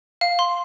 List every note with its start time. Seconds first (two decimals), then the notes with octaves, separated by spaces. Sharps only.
0.21 F5
0.39 C6